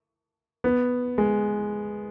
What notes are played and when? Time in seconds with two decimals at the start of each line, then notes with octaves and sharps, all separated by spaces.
0.64 B3
1.18 G#3